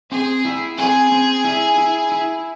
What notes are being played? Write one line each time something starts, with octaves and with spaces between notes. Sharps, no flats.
C4 G#4
E4
C4 G#4
C4
E4
E4
E4